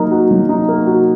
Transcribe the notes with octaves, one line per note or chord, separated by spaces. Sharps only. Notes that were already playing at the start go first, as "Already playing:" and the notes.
Already playing: F#3 A#3 D#4
F#4
F#3
D#4
A#3
F#4